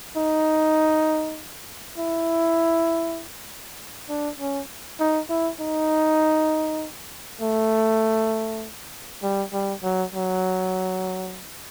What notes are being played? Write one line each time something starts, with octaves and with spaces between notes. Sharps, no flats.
D#4
E4
D4
C#4
D#4
E4
D#4
A3
G3
G3
F#3
F#3